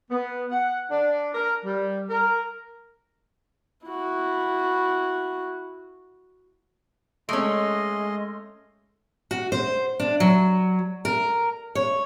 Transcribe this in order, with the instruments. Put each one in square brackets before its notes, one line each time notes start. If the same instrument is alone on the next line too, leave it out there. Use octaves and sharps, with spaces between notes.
[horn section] B3
F#5
D4
A#4
G3
A#4
[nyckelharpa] E4 F#4
[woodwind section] G#3 [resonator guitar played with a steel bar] A3 C#4 [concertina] D#5 C6
[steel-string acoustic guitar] F#4
C5
D4
F#3
A#4
C#5